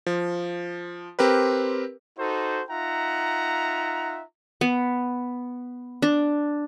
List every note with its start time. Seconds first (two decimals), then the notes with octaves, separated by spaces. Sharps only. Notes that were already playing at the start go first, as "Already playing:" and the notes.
0.06 F3
1.19 C4 G4 A#4 B4
2.18 D#4 F#4 A4 C5
2.69 D#4 F4 E5 F#5 A#5
4.61 B3
6.02 D4